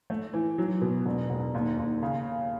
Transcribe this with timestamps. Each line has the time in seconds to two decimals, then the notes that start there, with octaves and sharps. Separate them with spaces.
0.10 A3
0.33 E3
0.58 F#3
0.81 B2
1.05 E1
1.30 E1
1.54 D#2
1.78 D#2
2.02 C#3